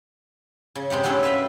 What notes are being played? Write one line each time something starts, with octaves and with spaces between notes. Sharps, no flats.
C#3
C3 G#3 G4 F#5
F#3 G3 A3 C#4 D4 E4
B4 E5 F5 G5 B5